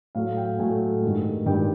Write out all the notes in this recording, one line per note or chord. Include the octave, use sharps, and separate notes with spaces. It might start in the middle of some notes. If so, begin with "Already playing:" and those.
A2 F#3 A3 F5
G5
A2 F#3 A3 G#5
G2 D#3 G#3
G2 D#3 G#3 G5